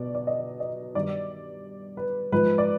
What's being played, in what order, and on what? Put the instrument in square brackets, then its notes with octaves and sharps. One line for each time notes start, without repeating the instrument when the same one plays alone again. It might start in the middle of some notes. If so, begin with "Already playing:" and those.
Already playing: [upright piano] B2 D5
D5
D#5
D#5
G2 D#3 D5
B4
G#2 F3 B4
D5